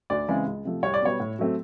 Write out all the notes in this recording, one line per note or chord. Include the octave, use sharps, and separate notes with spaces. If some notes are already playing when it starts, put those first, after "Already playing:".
D2 D5
C#3 E3 G#3 C4
C#2
C3 F3 A3
C2 C#5
D5
B2 G3 B3 C#5
A2
F#3 A3 C4